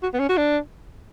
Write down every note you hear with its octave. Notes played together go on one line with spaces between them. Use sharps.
F#4
B3
C#4
F#4
D4